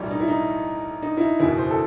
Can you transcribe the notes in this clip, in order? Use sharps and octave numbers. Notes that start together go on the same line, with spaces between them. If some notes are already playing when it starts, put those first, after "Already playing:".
Already playing: B1 A2 E3 G3
D#4
E4
D#4
D#4
E4
D#4
F#1 E2 B2 E4
C5
A4